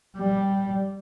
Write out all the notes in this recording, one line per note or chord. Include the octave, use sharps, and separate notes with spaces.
G3